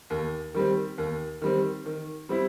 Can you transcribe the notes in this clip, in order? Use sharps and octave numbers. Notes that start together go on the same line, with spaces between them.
D#2
D#3 G3 C4
D#2
D#3 G3 C4
D#3
G3 C4 E4